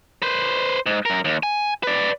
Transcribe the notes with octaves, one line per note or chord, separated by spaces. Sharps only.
B4 C5
G#2
F#2 A#4
D#2
G#5
B4 D5